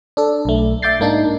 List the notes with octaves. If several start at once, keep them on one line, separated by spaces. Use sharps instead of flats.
D4 A4
B1 A3
E5 D6 G6 A6 C7
G#2 A#3 D4 D#4